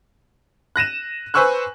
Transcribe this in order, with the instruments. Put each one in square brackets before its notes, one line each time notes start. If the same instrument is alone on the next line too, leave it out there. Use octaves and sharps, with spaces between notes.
[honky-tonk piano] F#6 A#6 D#7 E7
B4 C5 G#5 C#6 E6 F#6